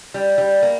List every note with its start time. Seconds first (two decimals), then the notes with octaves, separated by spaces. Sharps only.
0.14 G3
0.38 G3
0.63 A#3